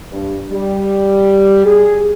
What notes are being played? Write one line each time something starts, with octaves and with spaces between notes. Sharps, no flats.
G2
G3
G#4